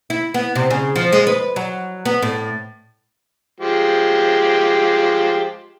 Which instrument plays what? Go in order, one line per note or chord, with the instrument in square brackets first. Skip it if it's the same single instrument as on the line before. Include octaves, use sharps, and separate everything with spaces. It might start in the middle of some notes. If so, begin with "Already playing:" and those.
[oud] E4
B3
C3
C#3
F3
G#3
B4
F#3
B3
A2
[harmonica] F3 G#3 G4